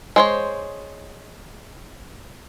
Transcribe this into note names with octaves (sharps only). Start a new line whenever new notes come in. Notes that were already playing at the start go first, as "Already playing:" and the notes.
G#3 C5 C#5